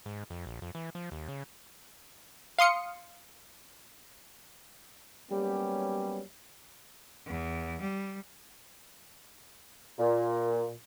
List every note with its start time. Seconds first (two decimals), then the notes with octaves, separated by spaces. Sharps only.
0.06 G#2
0.30 F2
0.46 A#1
0.62 F2
0.75 E3
0.95 F3
1.12 D#2
1.28 C#3
2.59 F5 C6 D#6 C#7
5.31 F#3 G3 A#3 B3 C#4 G4
7.27 E2
7.81 G3
9.99 A#2